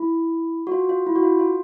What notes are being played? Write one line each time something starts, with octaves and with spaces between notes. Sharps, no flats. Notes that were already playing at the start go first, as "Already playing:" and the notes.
Already playing: E4
F#4
F4
F4
E4
F#4
F4
F4